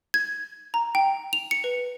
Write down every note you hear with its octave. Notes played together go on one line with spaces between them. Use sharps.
G#6
A#5
G5
F7
C#7
B4